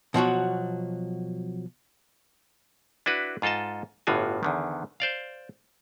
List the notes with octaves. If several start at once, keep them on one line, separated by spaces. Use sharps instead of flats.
B2 F3 F#3 F#4
D4 E4 F#4 B4
G#2 F4 A4 D#5 A5
G1 A2 D3 F4 F#4 G#5
E2 D3 D#3
C5 D5 F5